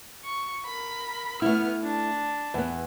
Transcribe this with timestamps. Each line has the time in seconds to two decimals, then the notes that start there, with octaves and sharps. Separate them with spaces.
0.24 C#6
0.66 A#4 B5
1.42 A3 B3 E4 F6
1.82 D4
2.54 E2 B3